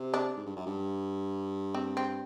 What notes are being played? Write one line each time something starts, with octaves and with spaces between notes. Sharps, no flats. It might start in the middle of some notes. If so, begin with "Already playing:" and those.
Already playing: C3
D4
G#2
G2
F#2
G2
C4
C4